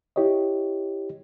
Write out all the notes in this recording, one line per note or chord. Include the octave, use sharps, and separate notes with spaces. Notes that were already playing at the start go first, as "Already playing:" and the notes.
E4 G4 C#5 D#5